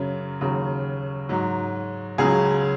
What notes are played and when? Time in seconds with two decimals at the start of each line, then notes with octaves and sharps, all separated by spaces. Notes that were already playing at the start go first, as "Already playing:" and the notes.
Already playing: F#2 C#3 F#3
0.41 D#2 C#3 F#3
1.29 G#2 F#3
2.18 C#2 C#3 F#3 G#4